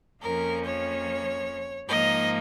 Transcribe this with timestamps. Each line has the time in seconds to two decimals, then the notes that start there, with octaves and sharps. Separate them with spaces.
0.21 F2 F3 A#3 C#4 A#4
0.63 C#5
1.87 G#2 F3 A#3 D#4 D#5